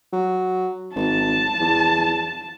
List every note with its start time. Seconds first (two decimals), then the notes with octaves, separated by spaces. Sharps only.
0.13 F#3
0.96 G#1 A5
1.60 E2